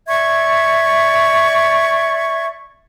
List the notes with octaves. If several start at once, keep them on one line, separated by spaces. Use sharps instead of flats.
D5 E5 C#6 G#6